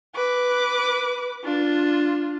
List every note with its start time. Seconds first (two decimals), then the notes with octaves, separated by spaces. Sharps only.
0.15 B4 D6
1.44 D4 F4